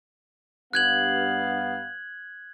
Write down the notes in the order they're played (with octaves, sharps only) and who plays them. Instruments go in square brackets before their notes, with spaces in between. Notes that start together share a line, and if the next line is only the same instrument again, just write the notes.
[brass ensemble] G2 B3 F5 [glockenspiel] F#6 G#6 F#7